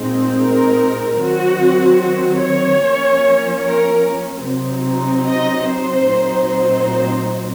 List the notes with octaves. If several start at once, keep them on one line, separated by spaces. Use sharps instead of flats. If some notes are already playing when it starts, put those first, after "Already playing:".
Already playing: A#2 G#3 C4 D#4
A#4
D#3 F#3 C4 F#4
F#4
C#5
F3 A#3 C#4
A#4
C3 F#3 C4 D#4
D#5
C5
A#2 F#3 C4 D#4
C5